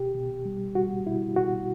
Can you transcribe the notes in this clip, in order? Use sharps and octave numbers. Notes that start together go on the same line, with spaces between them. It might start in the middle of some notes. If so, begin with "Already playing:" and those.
Already playing: B2 G4
B2
G3
G3 F#4
B2 E4
B2 F#4